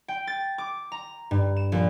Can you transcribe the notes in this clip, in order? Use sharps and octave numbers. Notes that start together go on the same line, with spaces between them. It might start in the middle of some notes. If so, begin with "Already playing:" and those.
G5
A6
D6
A#5
G2
E7
A#1